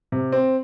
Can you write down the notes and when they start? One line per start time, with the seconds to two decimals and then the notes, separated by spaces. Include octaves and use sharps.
0.12 C3
0.32 C4